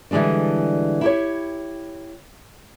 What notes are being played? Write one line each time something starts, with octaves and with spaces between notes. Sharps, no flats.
D3 E3 G3 G#3 D4
E4 G4 C#5